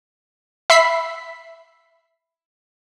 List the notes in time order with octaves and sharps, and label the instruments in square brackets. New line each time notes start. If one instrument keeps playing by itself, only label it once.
[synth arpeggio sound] E5 B5 B6 C7